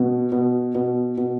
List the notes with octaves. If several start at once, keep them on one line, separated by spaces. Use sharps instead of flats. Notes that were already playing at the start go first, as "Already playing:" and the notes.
Already playing: B2
B2
B2
B2